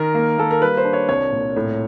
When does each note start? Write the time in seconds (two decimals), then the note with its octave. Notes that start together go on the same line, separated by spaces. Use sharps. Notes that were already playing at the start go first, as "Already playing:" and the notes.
Already playing: D#3 A#4
0.15 A#3
0.38 A#3 A4
0.51 A#4
0.62 G3 B4
0.77 C5
0.85 D4
0.93 C#5
1.08 C2 C#5
1.32 A#2
1.56 A2